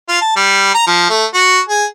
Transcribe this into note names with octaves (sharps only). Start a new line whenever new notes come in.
F4
A5
G3
A#5
F3
A3
F#4
G#4